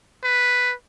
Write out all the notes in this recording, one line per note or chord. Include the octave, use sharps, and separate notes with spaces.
B4